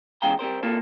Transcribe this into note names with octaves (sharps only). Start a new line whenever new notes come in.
E2 C#3 G#3 F5 G5 A#5
G3 C4 A#4 C5
C3 A#3 F4 A4